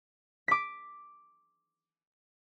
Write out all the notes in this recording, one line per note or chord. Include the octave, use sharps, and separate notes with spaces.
D6 B6